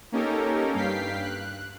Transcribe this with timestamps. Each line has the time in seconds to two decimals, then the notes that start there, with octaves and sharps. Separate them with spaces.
0.12 A#3 C#4 D#4 G4 A4 A#4
0.74 G2 F5 G5 B6 C7
1.22 F#6